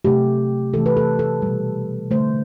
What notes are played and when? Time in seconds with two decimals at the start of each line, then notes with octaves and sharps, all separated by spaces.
0.05 C3 F#3 A3 G4
0.73 C3 E3 A3 A4
0.86 B4
0.97 A4
1.19 A4
1.42 B2 G3
2.11 D3 A3 C5